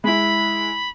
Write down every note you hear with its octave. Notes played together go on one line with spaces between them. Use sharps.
G#3 E4 B5